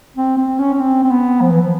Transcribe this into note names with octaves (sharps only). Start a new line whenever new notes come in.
C4
C4
C#4
C#4
C4
C4
B3
F3
E3
F3